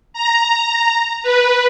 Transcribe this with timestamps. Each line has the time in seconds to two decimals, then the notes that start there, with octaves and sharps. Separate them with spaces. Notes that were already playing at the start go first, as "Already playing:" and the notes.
0.13 A#5
1.23 B4